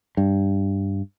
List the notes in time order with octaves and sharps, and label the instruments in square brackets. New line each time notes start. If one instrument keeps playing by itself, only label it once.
[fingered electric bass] G2